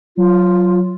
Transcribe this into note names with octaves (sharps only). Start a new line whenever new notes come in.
F#3 F4